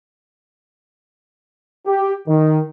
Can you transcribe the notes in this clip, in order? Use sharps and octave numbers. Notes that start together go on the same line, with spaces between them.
G4
D#3